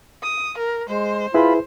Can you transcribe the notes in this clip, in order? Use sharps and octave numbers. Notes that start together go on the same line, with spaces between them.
D#6
A#4
G#3 C5
E4 F4 G#4 B4 B5